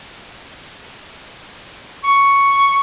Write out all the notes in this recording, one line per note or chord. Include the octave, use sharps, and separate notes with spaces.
C#6